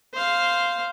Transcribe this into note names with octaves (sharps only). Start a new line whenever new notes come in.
C5 F5